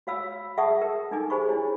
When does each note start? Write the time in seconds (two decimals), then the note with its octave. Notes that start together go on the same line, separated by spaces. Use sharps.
0.07 F#4 C#5 F5 B5 E6
0.57 G#4 E5 F#5 A5 C#6 D#6
0.82 A#4
1.11 D4 D#4 A4 G#5 D6
1.30 G4 G#4 C5 B5 C#6
1.49 D4 E4 C#5